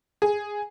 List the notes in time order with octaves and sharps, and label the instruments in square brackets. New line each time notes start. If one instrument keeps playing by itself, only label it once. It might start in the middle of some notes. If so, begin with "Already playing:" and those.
[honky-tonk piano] G#4